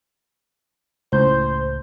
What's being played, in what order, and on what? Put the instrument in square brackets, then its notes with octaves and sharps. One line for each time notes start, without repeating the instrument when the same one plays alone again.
[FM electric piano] C#2 A2 G6 [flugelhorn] C5